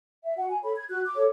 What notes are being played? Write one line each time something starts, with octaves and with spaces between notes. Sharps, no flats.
E5
F#4 F#5
G#5
A4 C#5 B5
G#6
F#4 F#6
D6
A4 C#5